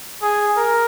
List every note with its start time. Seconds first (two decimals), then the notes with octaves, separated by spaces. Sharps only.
0.22 G#4
0.57 A#4